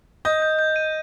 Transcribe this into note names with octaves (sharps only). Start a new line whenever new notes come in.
D#5 G6
G6
G6
D#7